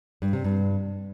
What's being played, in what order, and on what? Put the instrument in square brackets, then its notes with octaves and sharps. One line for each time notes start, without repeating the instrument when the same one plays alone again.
[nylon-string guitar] G2
C3
G2